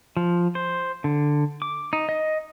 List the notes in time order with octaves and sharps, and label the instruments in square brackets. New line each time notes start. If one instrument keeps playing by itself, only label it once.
[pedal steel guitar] F3
C5
D3
D6
D#4
D#5